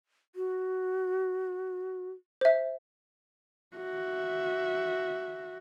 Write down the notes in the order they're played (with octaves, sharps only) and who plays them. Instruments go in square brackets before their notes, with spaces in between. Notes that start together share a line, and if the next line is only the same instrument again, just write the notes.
[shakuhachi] F#4
[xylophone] C5 E5
[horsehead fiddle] F#4 E5